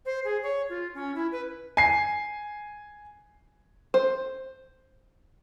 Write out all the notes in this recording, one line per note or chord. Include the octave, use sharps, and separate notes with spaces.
C5
G#4
C#5
F4
C#4
E4
B4
G#5 C7
C5